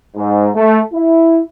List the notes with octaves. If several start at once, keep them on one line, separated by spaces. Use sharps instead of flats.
G#2
A3
E4